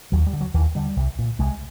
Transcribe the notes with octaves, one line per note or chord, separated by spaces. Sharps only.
D#2 F#3
G3
D3
F#3
D#2 E3
D3 G3
C2
A#2
C2 G#3